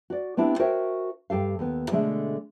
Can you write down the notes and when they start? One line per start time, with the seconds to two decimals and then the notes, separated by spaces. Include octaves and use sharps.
0.10 F#4 D5
0.37 B3 C4 D4 E4 G4
0.59 F#4 A#4 C5 C#5 E5 G5
1.30 G2 G4 A4 F5
1.59 D#2 B3
1.91 B2 D3 G#3 A3 G#4 E5